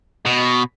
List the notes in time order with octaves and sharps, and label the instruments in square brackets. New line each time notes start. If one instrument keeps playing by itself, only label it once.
[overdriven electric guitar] B2